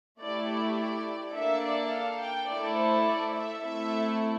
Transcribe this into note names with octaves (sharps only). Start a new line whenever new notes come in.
A3 E4 G4 D5
D5
D5
A#3 D4 A4 E5
D5
F5
G5
A3 E4 A4 D5
C5
D5
E5
A3 C4 E4 A4 E5